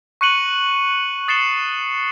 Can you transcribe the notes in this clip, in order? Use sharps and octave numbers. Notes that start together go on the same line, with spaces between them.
C#6 F#6 C#7 D#7 F#7
D#6 A6 C7 C#7 E7 G7